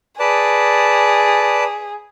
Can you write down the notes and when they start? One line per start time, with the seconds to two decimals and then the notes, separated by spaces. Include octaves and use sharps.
0.19 G#4 B4 D5 A5